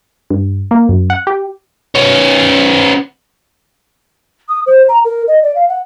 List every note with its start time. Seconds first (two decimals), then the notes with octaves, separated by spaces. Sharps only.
0.30 G2
0.71 A#3
0.89 F#2
1.10 F#5
1.27 G4
1.95 B3 C#4
4.49 D#6
4.66 C5
4.89 A#5
5.05 A#4
5.28 D#5
5.43 D5
5.55 F5
5.69 F#5